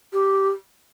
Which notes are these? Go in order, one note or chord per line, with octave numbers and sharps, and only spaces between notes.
G4